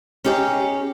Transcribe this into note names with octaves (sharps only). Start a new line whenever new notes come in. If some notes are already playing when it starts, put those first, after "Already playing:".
C#4 D#4 G4 G#4 C#5